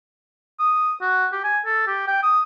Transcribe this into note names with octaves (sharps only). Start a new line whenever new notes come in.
D#6
F#4
G4
G#5
A4
G4
G5
D#6